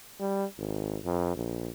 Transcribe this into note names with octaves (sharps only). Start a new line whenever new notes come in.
G3
G#1
F2
A#1